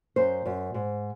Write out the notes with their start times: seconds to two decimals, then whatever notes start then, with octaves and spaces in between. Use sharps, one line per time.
0.16 F#2 C5
0.45 F#2
0.74 G#2